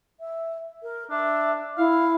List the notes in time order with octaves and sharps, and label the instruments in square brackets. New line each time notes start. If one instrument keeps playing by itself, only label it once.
[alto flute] E5
A#4
[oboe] D4 [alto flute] E5
[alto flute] E4 [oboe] F5